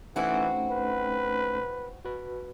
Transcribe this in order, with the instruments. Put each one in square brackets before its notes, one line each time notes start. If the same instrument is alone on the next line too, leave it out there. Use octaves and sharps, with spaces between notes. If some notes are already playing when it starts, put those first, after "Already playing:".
[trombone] E3 [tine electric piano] A3 C#4 D#4 [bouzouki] C4 E4 F#4
[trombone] B4
[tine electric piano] F#4 B4